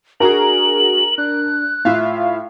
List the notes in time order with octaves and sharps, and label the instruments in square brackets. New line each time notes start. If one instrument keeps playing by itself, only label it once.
[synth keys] D4 F#4 G#4 [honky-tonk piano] A#4 A#5 [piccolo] F#7
[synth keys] D4 [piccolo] F#6
[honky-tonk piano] A2 [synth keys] F4 E5 F5